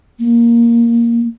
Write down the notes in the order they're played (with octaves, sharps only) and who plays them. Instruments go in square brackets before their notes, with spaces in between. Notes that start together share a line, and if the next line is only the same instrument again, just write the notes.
[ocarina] A#3